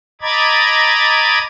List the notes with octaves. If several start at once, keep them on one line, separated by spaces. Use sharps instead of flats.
D#5 A#5 B5 D6 G#6 A6